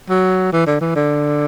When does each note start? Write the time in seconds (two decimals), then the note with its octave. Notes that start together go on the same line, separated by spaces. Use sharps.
0.09 F#3
0.52 E3
0.67 D3
0.80 E3
0.95 D3